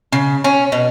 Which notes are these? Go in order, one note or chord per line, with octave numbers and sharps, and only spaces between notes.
C#3
C#4
B2